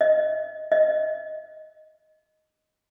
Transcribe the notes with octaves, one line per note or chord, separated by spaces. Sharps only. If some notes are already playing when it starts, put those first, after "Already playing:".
D#5
D#5